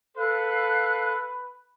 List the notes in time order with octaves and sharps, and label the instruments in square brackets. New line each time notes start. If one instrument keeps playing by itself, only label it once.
[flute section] A4 F5 F#6 [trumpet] B4